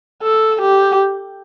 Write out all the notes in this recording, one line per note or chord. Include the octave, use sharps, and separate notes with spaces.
A4
G4